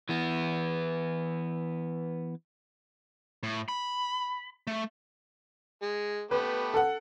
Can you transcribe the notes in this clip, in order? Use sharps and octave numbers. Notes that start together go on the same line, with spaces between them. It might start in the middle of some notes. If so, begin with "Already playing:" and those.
E3 B3
A2
B5
A3
G#3
A3 B3 G4 B4
A4 F#5